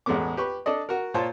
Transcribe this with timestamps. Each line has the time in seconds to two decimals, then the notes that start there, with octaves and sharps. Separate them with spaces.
0.06 A1 E2 G#3 A3 B3 D6
0.37 G4 B4 C#6
0.66 D4 A4 D5 D#5
0.89 F#4 A#4
1.14 A#2 F4 C5 C#5 A5